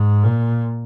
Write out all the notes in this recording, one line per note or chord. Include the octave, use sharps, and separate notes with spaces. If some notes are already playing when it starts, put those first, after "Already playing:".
Already playing: G#2
A#2